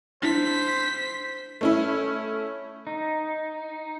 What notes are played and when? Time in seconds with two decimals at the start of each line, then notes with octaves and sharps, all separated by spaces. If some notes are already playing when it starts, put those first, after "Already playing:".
0.23 D4 E4 C5 B6
1.61 A3 C#4 E4
2.87 D#4